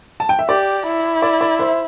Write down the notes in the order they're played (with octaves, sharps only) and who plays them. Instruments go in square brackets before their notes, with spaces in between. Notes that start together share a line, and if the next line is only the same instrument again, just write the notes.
[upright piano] A5
G5
E5
[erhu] G4 [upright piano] D5
[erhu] E4
[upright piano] D5
D5
C5 E5